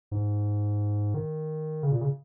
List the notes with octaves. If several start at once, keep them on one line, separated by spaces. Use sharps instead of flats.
G#2
D#3
C#3
A#2
C#3